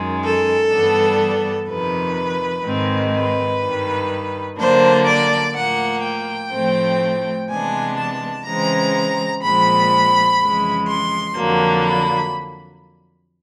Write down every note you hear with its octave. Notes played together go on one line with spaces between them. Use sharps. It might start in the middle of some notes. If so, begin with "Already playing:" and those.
Already playing: F#2 D#3 G#3
A4
G2 E3 G3 B3 D4
F2 C3 D#3 B4
G#2 D#3 G#3 C4
B4
G2 D#3 G3
D3 F#3 A#3 D4 C5
D5
A2 F3 A#3 F#5
G5
A2 F3 A3 C4
C3 E3 G#3 B3 D4 G#5
A5
C#3 E3 G#3 C4 A#5
A#2 F3 G#3 C4 B5
F2 C#3 E3 G#3
C6
F2 D3 F#3 A#3
B5